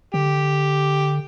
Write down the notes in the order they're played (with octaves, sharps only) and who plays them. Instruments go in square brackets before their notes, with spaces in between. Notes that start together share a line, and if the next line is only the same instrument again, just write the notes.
[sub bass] D3 [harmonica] G4